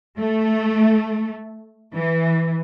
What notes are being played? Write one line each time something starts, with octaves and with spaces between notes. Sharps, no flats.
A3
E3